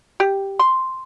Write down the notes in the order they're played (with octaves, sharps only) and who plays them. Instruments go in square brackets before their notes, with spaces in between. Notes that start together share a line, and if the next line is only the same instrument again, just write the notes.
[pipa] G4
C6